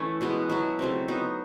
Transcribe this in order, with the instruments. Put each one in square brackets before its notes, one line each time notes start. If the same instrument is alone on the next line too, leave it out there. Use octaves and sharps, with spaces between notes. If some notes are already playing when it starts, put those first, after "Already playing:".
Already playing: [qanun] E3 A3 C#4
B2 G#3 B3
F#3 B3 E4
C#3 F#3 A3 C4
F#3 B3 D#4